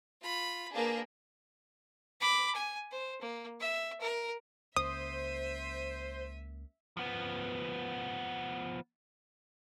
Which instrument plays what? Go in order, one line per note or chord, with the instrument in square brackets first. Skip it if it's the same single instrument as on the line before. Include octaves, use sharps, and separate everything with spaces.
[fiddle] F4 B5
[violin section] A#3 G#4 [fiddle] D4 B4
[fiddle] B5 D6
G#5
C5
A#3
E5
A#4
[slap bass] C#2 A#3 C#4 [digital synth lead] C5 [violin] E5 D#7 [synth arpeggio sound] D#6
[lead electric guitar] F3 B3